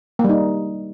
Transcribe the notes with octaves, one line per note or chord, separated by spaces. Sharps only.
A#3
G3
D#4